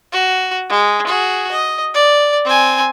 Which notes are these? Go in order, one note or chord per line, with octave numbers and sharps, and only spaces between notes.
F#4
G#3
F#4 G#4
D#5
D5
C4 G#5